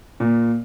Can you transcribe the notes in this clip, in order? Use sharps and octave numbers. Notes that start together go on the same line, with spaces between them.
A#2